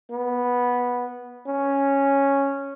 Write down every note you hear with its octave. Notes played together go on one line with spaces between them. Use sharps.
B3
C#4